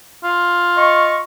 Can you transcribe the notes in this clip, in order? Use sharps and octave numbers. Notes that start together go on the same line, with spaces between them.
F4
D#5 C#6